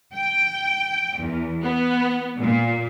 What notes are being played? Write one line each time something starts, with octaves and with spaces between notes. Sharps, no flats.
G5
E2
B3
A#2